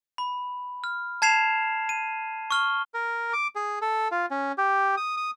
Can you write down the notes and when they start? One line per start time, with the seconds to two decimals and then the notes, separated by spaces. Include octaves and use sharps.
0.18 B5
0.84 F6
1.22 A5 G#6 C7 E7 F7
1.89 D#7
2.51 C#6 F6 G7
2.94 A#4
3.33 D6
3.55 G#4
3.82 A4
4.12 F4
4.31 C#4
4.58 G4
4.97 D#6
5.17 D#6